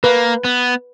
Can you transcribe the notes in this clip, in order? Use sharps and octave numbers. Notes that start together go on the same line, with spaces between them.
A#3 B4
B3